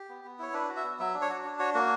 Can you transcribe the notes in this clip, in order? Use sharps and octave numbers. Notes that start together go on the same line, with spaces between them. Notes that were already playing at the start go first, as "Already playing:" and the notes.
Already playing: G4
B3
B3
E4 C#5
D4 B4
F#4
E5
B3
F#3 E5
D4
C#5
F#4
D4
F#4 C#5
A#3 F#4